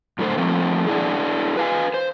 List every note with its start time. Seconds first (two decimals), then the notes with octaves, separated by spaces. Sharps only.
0.19 F#2 A2 D3 A3 A4 C5
0.37 F3 A3 A#3 C4
0.87 D4 E4 G#4
1.57 B4 F5 G#5
1.94 C5